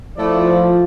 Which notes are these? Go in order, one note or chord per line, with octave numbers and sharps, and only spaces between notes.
F3 A3 E4 D5